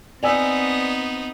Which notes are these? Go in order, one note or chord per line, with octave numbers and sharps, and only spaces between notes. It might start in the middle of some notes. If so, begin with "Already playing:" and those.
B3 C4 D#4 D5 G#5 E6